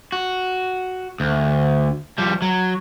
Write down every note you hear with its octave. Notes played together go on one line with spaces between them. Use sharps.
F#4
D2
F3 G3
F#3